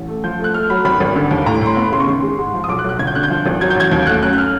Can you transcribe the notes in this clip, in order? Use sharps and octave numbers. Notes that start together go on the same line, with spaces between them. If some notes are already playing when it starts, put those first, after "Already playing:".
Already playing: A1
A3
F3 G6
A3 F#6
A3 F6
F#3 B5
G#1 B5
G#1
D3
D#2
A2 A#5
A2 C6
B3 B5
C#3 C6
C#6
D#3 C6
G#3
G#2
F3
D#6
B1 D6
F#6
B1
F#6
G1 G#6
G6
D3 F#6
G6
F3
G#1
F#3 G#6
G6
A1 G#6
D#2 G6
A3 F#6
F#2 F#6
F#6
F6